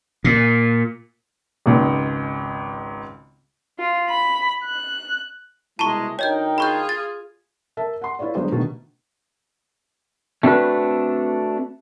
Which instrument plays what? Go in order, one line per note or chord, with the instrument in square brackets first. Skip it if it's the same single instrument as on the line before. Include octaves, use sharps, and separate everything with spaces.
[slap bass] A#2
[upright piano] G#1 C#2 G#2
[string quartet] F4
B5
F#6
[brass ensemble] C2 B2 E4 [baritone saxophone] G#3 [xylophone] A5 A#5 C#6
[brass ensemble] D2 A#4 G5 [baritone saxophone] D#4 [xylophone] C#5 D#5 G6
[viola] F4 G#4 [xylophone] B5 C#6 G6
[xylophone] A6
[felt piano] A#4 E5 A5
F#5 C6
E4 F4 B4 C#5 D5
D3 F#3 G#3 B3 C5
B2 D3 D#3 A3
[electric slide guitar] A3 C4 D4 F#4 A4 B4